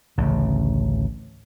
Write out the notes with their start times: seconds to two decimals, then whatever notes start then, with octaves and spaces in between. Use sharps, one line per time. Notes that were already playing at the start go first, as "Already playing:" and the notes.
0.18 A1 D2 C#3